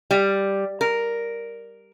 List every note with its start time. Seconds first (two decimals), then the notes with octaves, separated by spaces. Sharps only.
0.11 G3
0.81 A#4